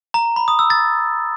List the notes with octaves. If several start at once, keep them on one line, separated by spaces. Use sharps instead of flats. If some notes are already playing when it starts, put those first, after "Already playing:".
A#5
B5
D#6
E6
A6